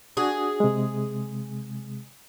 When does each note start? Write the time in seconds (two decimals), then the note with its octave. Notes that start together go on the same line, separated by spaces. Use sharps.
0.17 D4 F#4 G#4
0.60 C3 G#3